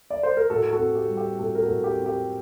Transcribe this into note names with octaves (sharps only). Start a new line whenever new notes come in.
D5
C5
A#4
A2 F#4 A4
F#4 A4
C4
G4
G3
G4
A2 F#4 A4
A#4
F#4 A4
A2
G4
C4
G4